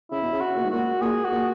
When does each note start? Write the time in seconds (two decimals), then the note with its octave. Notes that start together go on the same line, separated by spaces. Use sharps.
0.11 C#3 E4
0.22 B2
0.32 C#3
0.40 F#4
0.56 A#2
0.64 G#2
0.70 A#2 F#4
1.01 A#2 G#4
1.24 F#4
1.32 A#2